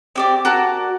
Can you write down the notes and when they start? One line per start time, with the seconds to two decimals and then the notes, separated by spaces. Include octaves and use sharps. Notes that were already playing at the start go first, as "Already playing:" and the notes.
0.16 C4 G4 D5
0.45 F#4 A#4 D5 A5